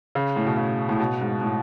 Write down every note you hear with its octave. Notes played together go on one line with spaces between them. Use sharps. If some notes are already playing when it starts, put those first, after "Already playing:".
C#3
A2
B2
C#3
A2
B2
G#2
A2